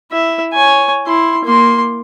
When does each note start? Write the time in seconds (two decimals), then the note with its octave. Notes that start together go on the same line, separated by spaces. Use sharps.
0.11 E4 E5
0.53 C#5 G#5
1.07 E4 C6
1.45 A#3 C6